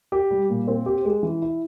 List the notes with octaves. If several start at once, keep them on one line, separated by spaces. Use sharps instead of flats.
G4
G3
A#2
C4
G4
G#3
E3
E4